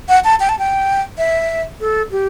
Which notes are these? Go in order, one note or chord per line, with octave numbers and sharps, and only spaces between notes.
F#5
A5
G5
A5
G5
E5
A4
G4